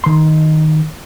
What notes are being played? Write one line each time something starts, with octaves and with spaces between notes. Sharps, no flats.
D#3 C6